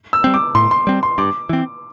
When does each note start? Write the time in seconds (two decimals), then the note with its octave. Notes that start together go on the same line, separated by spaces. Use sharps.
0.13 E6
0.24 G3 C4
0.34 D6
0.55 A2 C6
0.71 C6
0.87 G3 C4
1.03 C6
1.18 G2 D6
1.49 E3 C4